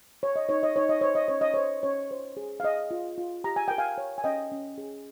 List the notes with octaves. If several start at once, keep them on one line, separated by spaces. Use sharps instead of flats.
C#5
D#5
D#4 C#5
D#5
D#4 C#5
D#5
C5 C#5
D#5
C#4 C#5
D#5
C5 C#5
C#4 C#5
C5
G#4
F5
G#4 D#5
F4
F4
G4 A#5
G#5
A#4 G5
F5 G#5
C#5
G#5
C#4 D#5 G5
C#4
G#4